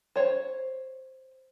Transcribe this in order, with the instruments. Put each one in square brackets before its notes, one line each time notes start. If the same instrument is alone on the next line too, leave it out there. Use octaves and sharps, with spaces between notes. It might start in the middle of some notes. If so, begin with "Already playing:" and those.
[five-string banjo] C5 C#5